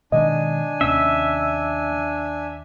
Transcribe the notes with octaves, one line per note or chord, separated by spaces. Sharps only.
B2 D#3 G#3 D4 D#5 G#5
D#2 C3 C#4 E5